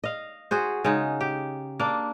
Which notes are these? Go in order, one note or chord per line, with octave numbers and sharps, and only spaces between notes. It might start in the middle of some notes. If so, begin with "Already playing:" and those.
D#5 F5
F#4 G#4 C5
C#3 G#3 D#4
G4
A#3 D4